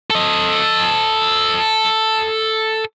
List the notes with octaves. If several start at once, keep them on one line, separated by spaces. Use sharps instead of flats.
A4 D#5